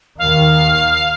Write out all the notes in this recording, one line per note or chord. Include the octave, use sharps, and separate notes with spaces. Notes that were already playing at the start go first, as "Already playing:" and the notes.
D#2 D#3 F5